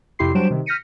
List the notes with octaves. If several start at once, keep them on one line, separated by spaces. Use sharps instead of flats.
F2 C3 E4 G4 C6 C7
F#3 G3 D4 C5 D7 E7
C3 D#3
F6 G6 A#6 B6 C#7 D#7